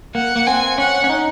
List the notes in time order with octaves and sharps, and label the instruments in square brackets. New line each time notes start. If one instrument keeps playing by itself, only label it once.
[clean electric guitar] A#3 [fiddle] F#5
[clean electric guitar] A#3
[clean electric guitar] C4 [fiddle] G#5
[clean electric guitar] C#4 [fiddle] F#5
[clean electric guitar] C#4
D#4